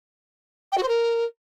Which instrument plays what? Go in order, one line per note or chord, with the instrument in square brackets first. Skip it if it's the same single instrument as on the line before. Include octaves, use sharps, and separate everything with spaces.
[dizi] G5
F#4
C5
A#4